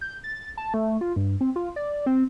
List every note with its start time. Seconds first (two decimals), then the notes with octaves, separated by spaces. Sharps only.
0.01 G6
0.24 A6
0.57 A5
0.74 A3
1.01 F4
1.16 G2
1.41 C4
1.56 F4
1.76 D5
2.06 C4